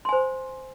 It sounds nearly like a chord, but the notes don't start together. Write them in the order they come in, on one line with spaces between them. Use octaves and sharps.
C6 G#5 C5